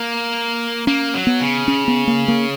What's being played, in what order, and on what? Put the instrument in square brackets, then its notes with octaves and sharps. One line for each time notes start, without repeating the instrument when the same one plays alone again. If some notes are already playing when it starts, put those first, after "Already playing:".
Already playing: [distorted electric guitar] A#3
[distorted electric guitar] A#3 [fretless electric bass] C#4
[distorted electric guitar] F#3
[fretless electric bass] B3
[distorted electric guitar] C#3
[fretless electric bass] C#4
B3
A#3
A#3